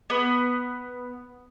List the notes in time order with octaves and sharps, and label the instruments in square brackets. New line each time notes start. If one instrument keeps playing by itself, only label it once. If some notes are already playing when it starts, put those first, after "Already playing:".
[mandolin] B3